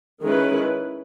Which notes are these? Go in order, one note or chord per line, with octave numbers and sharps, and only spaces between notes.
D#3 G#3 C#4 E4 B4